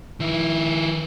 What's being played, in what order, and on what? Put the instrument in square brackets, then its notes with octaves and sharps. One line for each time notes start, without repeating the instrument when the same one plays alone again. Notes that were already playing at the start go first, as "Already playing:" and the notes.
[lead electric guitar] D#3 E4